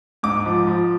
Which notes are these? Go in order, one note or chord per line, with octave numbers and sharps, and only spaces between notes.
G#2 D6
F3
F3